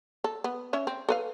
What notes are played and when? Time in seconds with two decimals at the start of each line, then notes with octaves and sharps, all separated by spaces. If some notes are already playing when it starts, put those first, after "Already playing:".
0.24 A4
0.44 B3
0.73 C#4 C#5 E5
0.87 C4
1.09 A4 B4 F5